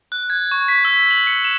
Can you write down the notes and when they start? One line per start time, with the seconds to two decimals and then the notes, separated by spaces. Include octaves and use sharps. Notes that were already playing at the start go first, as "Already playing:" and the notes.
0.12 F#6
0.30 G#6
0.51 C#6
0.68 B6
0.85 E6
1.11 F#7
1.27 C#7
1.45 E7